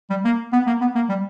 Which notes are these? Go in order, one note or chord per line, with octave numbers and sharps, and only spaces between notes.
G3
A#3
B3
A#3
B3
A#3
G3